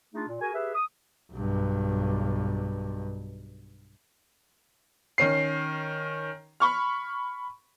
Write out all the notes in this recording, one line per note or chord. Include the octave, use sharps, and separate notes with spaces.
A3 D4 D#4 F4 G#4
A#2
F#4 G#4 A#4 G#5
G4 G#4 B4 E5
D#6
B1 G2
D#3 C#4 C7
B5 C#6 F6